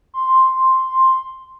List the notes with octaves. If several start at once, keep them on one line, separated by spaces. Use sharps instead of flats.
C6